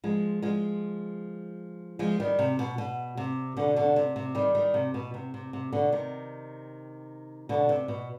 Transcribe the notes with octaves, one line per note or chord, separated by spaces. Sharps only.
F3 G#3
F3 G#3
F3 G#3
D#3 G3
C3
B2
B2
C3
B2 D3
B2 D3
C3
C3
D#3 G3
D#3 G3
C3
B2
C3
C3
C3
B2 D3
C3 D#3
B2 D3
C3
B2